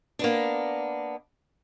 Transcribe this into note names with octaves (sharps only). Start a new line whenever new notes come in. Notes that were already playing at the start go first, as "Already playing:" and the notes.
A#3 B3 D4